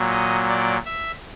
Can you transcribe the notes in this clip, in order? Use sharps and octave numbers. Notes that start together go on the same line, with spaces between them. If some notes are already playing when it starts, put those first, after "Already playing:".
Already playing: A#2 F#3
D#5
D5
E5